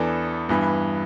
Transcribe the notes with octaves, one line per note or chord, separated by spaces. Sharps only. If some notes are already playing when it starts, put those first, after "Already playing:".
Already playing: E2 E3 B3 D4 A4
G2 E3 B3